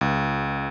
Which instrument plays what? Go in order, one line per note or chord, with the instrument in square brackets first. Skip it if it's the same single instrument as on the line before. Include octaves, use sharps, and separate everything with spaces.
[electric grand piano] C#2